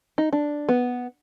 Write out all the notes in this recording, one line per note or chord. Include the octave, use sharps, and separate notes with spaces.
D#4
D4
B3